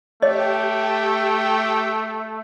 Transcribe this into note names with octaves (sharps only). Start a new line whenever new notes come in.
A3 G4 C#5 D#5 G5